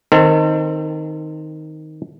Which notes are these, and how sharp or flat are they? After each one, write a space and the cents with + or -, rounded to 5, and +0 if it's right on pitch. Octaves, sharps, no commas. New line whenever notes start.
D#3 +0 C4 +0 A4 +40